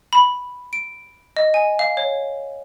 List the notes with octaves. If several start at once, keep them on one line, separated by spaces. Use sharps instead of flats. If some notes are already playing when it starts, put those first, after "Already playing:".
B5
D7
D#5
G#5
F5
C#5